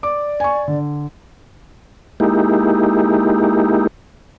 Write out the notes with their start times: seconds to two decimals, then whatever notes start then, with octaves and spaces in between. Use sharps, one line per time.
0.03 D5 D6
0.40 G#5 C#6
0.68 D3
2.20 G#3 A#3 D#4 E4 G4